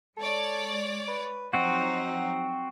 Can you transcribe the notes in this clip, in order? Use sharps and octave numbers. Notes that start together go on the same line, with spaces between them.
G#3 A4 C#5 D5
B4
F3 F#3 C4 D#4 F#4 F#5